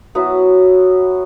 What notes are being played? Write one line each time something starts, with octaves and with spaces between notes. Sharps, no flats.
F#3 B3 E4 F#4